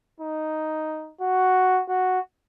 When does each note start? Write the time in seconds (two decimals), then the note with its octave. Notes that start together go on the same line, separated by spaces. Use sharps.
0.20 D#4
1.21 F#4
1.89 F#4